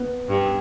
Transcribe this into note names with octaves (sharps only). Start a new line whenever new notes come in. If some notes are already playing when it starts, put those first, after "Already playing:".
Already playing: B3
G2